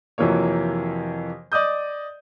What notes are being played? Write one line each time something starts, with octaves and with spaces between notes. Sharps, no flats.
F2 C3 E3 F#3 A#3 C#5
D5 D#5 D#6 G6